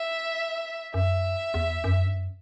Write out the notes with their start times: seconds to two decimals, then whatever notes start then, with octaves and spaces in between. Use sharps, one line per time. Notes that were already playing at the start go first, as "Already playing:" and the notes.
Already playing: E5
0.94 F#2 E5
1.54 E2
1.84 F#2
2.06 G2
2.14 F#2